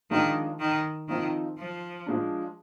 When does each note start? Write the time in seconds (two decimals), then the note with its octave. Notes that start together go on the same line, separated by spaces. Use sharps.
0.11 D#3 F3 G#3 D4 F4
0.60 D#3
1.08 D#3 F3 C4 D#4
1.57 F3
2.06 F3 G#3 D4